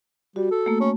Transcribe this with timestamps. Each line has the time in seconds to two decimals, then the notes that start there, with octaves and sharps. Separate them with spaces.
0.36 G3 F#4
0.51 A4
0.66 A3 A#3
0.81 C#4